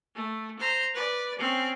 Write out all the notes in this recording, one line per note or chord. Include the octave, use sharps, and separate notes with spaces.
A3
C5 A#5
B4 D5
C4 C#4